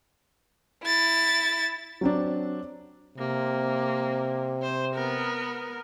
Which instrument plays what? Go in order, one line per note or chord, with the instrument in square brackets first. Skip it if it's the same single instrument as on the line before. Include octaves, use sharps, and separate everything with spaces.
[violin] E4 A6
[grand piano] F#3 C4 D4
[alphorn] C3 [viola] A#3
[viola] C5
B3 A#4